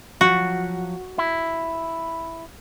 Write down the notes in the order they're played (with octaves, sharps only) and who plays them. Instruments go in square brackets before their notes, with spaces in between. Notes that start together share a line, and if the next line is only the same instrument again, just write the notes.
[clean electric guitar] F3 F#3 [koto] F#4
[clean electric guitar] E4